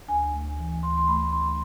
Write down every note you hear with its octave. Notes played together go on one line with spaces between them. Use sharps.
D2 G#5
A3
E3
D2 C6
C6
A3 B5
D2 C6